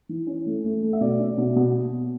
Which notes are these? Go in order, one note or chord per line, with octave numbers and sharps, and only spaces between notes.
E3
C#4
A3
A3
A3
E5
B2 D5
C#4
B2
B2